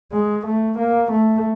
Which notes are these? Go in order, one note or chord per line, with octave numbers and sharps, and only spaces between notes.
G#3
A3
A#3
A3